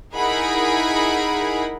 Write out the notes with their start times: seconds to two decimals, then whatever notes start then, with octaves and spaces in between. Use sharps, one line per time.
0.15 D#4 E4 G#4 A#4 F#5 B5